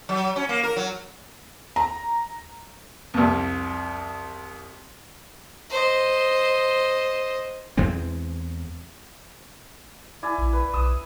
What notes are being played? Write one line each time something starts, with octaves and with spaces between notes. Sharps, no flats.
F#3
C#4
A#3
A#4
F#3
A#5
C2 F2
C5 D#5
E2 E3 G#3 C4
E4 D5 G#5
A#1
B4
B1 D#6 E6